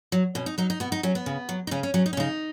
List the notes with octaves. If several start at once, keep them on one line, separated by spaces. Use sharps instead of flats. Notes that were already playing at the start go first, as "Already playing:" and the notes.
F#3
B2 C#4
D#4
F#3 D#4
D#4
B2 B3
D#4
F#3 C#4
B3
C#3
F#3
D#4
C#3 C#4
C#4
F#3 C#4
D#4
C#4
C#3 D#4